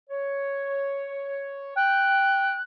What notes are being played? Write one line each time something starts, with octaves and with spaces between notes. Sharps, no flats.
C#5
G5 F#6